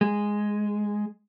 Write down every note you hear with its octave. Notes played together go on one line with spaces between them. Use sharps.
G#3